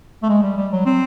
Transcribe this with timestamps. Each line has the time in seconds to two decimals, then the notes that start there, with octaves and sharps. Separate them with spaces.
0.23 A3
0.30 G#3
0.43 G3
0.57 G3
0.72 F#3
0.86 C4